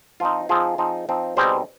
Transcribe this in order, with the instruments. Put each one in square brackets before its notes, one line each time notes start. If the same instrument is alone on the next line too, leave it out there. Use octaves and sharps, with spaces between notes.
[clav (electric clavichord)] F3 C4 D#4 F4
F3 C4 D#4 F4 G#4
F3 C4 D#4
F3 C4 D#4
B2 G3 C4 D#4 G#4 C5